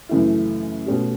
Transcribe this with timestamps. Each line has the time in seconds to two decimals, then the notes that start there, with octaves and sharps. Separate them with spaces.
0.09 F#2 C#3 E3 A3 E4
0.86 B2 A3 C#4 G4